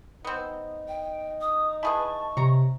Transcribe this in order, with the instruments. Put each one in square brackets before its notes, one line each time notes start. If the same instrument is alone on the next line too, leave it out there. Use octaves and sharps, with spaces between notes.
[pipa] B3 C4 [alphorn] D#4
[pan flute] G5
D#6
[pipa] E4 G#4 B4 [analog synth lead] A5 [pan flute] C#6
[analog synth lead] C3 [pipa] C#5 A#5